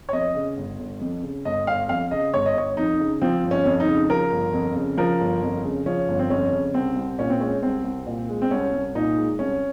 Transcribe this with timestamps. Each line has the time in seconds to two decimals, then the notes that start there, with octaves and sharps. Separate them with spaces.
0.09 C#5
0.13 F2 D#5
0.35 C#3
0.57 G1
0.79 G1
1.01 F2
1.23 C#3
1.45 G1 D#5
1.67 G1 F5
1.89 F2 F5
2.11 C#3 D#5
2.33 G1 C#5
2.46 D#5
2.55 G1 C#5
2.77 F2 D#4
3.00 C#3
3.22 F3 C4
3.44 G1
3.51 C#4
3.66 F2
3.80 D#4
3.87 C#3
4.10 F3 A#4
4.32 G1
4.54 F2
4.76 C#3
4.97 F3 A#4
5.20 G1
5.42 F2
5.64 C#3
5.86 F3 C#4
6.08 G1
6.19 C4
6.30 F2 C#4
6.52 C#3
6.74 C2 C4
6.96 C2
7.19 A#2 C#4
7.30 C4
7.41 G#3 C#4
7.63 C2 C4
7.85 C2
8.06 A#2
8.29 G#3
8.42 C4
8.51 C2 C#4
8.73 C2
8.95 A#2 D#4
9.17 G#3
9.39 C2 C#4